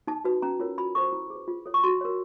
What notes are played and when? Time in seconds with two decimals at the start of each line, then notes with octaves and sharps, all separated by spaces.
0.07 D#4 A5
0.24 F#4 B4
0.42 C#4 A#5
0.60 F4 A#4 C#5
0.78 F#4 B5
0.95 A4 C5 C#6
1.13 E4
1.30 G#4 B4
1.48 F4
1.66 A4 C#5
1.74 C#6
1.84 F#4 C6
2.01 A#4 C#5